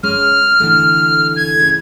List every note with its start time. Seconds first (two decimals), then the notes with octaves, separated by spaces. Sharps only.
0.03 G#3 C#4 F6
0.60 D3 E3 A3
1.36 G#6
1.59 C#3